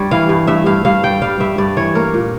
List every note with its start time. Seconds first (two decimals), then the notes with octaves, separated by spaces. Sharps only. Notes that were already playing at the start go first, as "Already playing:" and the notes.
Already playing: G2 G3 C#5
0.11 E3 F5
0.29 G2
0.47 G2 E5
0.66 G2 F5
0.85 G2 F5
1.03 G3 G5
1.22 G3 F5
1.40 G2 E5
1.58 G2 D5
1.77 E3 C#5
1.95 A#3 A#4
2.14 A#2